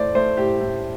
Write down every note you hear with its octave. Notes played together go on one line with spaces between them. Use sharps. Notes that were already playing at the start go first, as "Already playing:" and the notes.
Already playing: A2 A3 C5 D5
A3 C5
A2 G4
A2